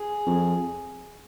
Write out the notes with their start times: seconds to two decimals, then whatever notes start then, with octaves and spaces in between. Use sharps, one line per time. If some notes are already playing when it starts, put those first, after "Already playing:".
Already playing: G#4
0.26 F2